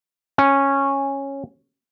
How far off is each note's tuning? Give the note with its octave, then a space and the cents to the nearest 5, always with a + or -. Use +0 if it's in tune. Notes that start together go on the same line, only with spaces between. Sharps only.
C#4 -10